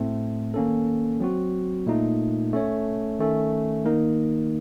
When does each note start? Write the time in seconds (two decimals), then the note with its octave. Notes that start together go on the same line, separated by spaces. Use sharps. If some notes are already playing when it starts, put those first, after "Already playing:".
Already playing: A2 A3 C4
0.54 D#3 A#3 C#4 A4
1.20 F#3 C4 F#4
1.86 A#2 A3 D#4
2.53 A3 C#4 A4 C#5
3.19 D#3 A3 C#4 A4
3.85 D#3 A#3 D#4 A#4